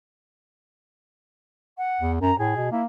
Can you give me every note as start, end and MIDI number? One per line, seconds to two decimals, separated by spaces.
1.77 2.11 78
2.00 2.16 40
2.21 2.32 42
2.21 2.37 82
2.38 2.54 45
2.38 2.69 68
2.56 2.70 47
2.71 2.85 58
2.71 2.82 64